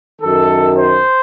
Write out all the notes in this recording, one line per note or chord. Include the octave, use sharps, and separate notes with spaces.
F#2 D#3 A4
C5